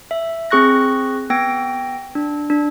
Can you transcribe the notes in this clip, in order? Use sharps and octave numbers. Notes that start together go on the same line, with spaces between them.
E5
C4 G#4 C#6 F#6 A#6
B3 G5 A#6 D7
D4
D4